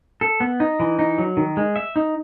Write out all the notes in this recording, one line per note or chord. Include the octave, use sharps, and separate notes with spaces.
A4
B3
D#4
E3
D#4
F#3
D#3
G#3
E5
D#4